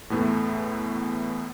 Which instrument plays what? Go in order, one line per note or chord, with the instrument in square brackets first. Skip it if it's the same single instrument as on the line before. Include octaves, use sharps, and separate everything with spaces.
[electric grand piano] E2 A2 A3 B3 E4